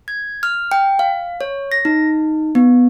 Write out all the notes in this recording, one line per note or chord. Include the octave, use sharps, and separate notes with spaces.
G#6
F6
G5
F5
C#5
A#6
D#4
B3